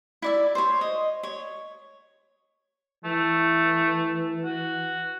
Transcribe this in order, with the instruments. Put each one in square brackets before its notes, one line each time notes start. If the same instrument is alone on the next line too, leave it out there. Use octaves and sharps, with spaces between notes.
[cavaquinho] E4 D5 E5
C5 C#5
D#5
C#5
[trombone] E3 [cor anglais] A3
[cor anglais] F#4